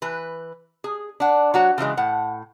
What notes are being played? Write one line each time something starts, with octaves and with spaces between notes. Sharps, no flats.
E3 B4
G#4
D4 F#5
F#3 F#4 C#5
C#3 E3 F#3 G#3
A2 F#5